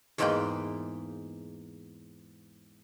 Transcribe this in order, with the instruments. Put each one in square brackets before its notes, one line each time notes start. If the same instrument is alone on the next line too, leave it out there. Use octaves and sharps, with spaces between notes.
[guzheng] E2 G#2 G#3 A#3 B4 G5